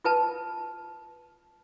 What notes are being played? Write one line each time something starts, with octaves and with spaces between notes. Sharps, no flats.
F4 B4 A5